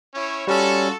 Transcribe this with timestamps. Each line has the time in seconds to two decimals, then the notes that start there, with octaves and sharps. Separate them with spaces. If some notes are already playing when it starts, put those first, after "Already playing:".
0.15 C#4 E4 C#5
0.47 G3 C#4 F4 F#4 A4